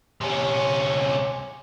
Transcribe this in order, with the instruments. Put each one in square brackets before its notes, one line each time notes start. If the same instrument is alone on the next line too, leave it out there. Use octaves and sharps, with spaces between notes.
[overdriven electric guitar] C3 C#4